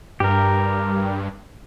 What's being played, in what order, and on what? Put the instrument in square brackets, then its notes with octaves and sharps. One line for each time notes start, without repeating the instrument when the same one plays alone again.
[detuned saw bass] G2 [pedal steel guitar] G4 A#4